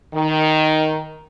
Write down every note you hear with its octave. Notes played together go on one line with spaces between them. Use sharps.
D#3